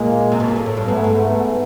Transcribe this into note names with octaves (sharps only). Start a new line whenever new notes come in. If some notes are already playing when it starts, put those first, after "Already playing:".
Already playing: A#2 G#3 A#3
C3
B2
A#2
A2
A2
G2
G#2 A3 B3
G#2
A3 B3